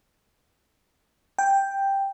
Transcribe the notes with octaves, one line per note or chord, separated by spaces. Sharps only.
G5